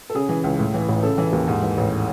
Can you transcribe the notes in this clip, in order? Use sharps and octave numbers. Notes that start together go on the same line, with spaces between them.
A4
C#3 G#4
E3
C#2
A2
E3
A1
C#3 A4
E3
D#2
G#2
E3
A1